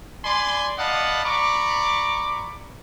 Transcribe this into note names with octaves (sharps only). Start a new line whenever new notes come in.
D5 G#5 B5 C6
D5 D#5 F5 F#5 A5 B5
D5 A#5 B5 C#6 D6